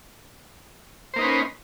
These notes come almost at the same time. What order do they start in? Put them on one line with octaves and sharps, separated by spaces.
C5 A#3 D#4 B4 C#4